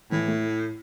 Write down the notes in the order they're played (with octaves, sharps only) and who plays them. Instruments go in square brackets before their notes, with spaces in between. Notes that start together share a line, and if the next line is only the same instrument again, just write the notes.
[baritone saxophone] A2 [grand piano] E3
[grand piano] A3